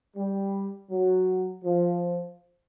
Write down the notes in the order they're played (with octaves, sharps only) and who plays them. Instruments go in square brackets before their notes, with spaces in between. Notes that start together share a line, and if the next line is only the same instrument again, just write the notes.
[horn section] G3
F#3
F3